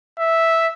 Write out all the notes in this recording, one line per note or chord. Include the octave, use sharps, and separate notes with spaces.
E5